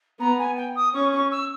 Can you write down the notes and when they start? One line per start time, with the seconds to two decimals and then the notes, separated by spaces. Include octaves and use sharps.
0.19 B3 A#5
0.38 G#5
0.56 G5
0.75 D#6
0.94 C#4 C#6
1.12 C#6
1.31 E6